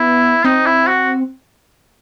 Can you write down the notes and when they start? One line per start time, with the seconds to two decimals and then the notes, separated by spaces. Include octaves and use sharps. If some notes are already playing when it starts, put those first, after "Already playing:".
Already playing: B3 E4
0.44 C4 D#4
0.66 E4
0.88 F#4